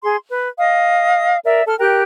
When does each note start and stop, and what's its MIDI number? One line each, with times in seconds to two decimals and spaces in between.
0.03 0.18 68
0.03 0.18 84
0.28 0.48 71
0.59 1.37 75
0.59 1.37 77
0.59 1.37 87
1.45 1.62 70
1.45 1.62 74
1.45 1.62 76
1.67 1.76 69
1.67 1.76 89
1.79 2.02 67
1.79 2.02 70
1.79 2.02 79
1.79 2.02 90